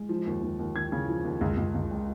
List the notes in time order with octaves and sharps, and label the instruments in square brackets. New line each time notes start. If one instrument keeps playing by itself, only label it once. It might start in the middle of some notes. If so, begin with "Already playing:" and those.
Already playing: [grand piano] G#3
F3
D#2
D#2
D#2
D#2 G#6
C#3
F3
D#2
C#2
C#2
C#2
G#3